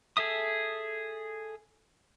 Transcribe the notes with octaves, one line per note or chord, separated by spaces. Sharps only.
G#4 A4 E5 D#6